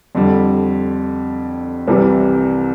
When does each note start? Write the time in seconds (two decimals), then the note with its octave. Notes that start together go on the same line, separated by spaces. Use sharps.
0.15 F2 D3 G3
1.88 C2 C3 E3 G3